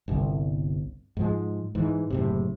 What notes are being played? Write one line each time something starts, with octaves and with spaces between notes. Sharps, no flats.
G1 C2
G#2 F3 G#3
G#2 E3
F#1 A2 C3